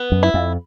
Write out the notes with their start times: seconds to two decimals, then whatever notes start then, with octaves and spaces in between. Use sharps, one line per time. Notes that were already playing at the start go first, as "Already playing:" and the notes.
Already playing: B3
0.12 F#2
0.23 E4
0.34 F2